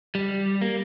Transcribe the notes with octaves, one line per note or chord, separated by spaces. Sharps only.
G3
A#3